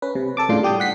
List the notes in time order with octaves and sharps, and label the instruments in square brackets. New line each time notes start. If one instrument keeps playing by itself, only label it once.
[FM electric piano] C#4 B4
C3
A4 A5 D6
A2 C#3 D4 F4 C6
G3 G4 D#6 G6
F#5 B6 C7